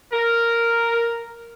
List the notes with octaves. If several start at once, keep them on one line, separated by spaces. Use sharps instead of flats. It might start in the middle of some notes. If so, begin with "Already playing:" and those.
A#4